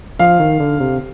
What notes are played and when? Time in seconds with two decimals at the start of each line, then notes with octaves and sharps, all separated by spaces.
0.19 F3 F5
0.40 D#3
0.60 D3
0.80 C3